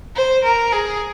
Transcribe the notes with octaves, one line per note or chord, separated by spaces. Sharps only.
C5
A#4
G#4